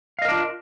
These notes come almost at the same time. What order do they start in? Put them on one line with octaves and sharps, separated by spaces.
F5 D#5 A#4 D4 F4